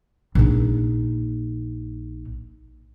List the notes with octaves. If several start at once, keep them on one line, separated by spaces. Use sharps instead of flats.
A#1 D#4